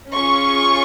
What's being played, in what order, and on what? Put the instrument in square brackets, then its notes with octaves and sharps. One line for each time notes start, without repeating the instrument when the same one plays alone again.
[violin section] C#4 F4 G#4 C#6